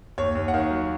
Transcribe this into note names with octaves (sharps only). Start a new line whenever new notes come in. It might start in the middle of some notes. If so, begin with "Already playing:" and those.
D#2 C#5
D#2
F#5
D#3 F5
F#3